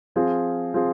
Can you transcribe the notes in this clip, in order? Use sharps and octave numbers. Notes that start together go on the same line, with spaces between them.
F3 C4 F4 G#4
F3 C4 F4 G#4